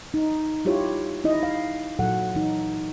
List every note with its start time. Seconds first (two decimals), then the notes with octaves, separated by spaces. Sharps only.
0.14 D#4
0.65 G3 E4 F4 G4 C#5
1.24 D#4 E4 D#5
1.43 F5
1.99 A#2 F#3 A4 F#5
2.35 E3 D#4